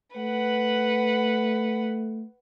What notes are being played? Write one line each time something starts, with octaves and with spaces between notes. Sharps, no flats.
A3 B4 F#5